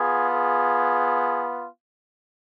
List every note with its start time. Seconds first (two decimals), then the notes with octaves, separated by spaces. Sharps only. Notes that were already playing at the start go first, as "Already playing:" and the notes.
Already playing: B3 F4 G#4
0.32 G#4